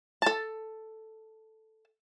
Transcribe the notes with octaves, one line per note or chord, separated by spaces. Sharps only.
A4 A5